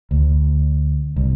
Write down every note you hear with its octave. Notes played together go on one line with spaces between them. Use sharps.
D2
C2